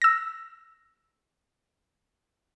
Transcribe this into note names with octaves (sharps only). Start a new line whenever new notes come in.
E6 A#6